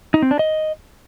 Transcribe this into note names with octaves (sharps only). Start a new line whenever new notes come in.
D#4
C4
D4
D#5